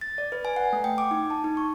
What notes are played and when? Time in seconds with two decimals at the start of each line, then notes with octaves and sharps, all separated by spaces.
0.01 A6
0.18 D5
0.32 B4
0.45 G#5
0.56 F#5
0.73 A3
0.84 G5
0.98 D6
1.11 D#4
1.30 A5
1.44 D#4
1.57 C#6